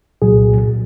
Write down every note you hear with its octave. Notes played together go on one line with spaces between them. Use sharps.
C2 A#2 F#3 G#4